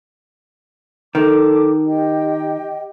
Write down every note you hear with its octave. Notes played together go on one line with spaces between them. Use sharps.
D#3 A4 A5 D6
G4 D#5 G5